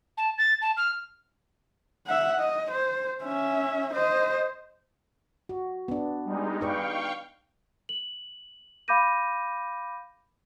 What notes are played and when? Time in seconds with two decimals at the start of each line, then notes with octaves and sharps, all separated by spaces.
0.17 A5
0.38 A6
0.62 A5
0.77 F6
2.07 E5 F#5
2.39 D#5
2.70 C5
3.23 C#4 E5
3.93 C5 D#5
5.49 F#4
5.88 B3 D4
6.25 G3 G#3 D#4
6.61 D#4 B4 D5 F5 G5 C#6
7.89 F#7
8.88 F5 B5 D6 G6 A#6 D#7